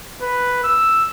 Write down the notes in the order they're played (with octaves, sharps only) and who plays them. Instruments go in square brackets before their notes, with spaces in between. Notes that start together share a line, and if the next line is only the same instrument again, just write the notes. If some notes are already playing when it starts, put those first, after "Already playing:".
[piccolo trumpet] B4
E6